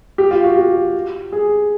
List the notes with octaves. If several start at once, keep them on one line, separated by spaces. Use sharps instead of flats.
G4
F4
F#4
G4
G#4